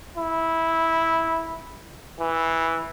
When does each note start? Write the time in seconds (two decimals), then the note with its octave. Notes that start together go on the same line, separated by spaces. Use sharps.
0.17 E4
2.20 E3